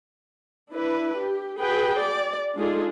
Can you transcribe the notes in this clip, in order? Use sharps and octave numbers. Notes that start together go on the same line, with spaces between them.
D4 E4 B4
G4
F#4 G#4 B4 G5
D5
G#3 D4 D#4 F4 G#4 A4